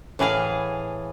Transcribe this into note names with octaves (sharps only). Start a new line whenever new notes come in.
A2 E3 G#4 F5